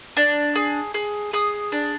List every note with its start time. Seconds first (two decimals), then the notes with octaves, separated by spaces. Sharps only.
0.17 D4
0.55 G#4
0.94 G#4
1.33 G#4 D#6
1.72 D4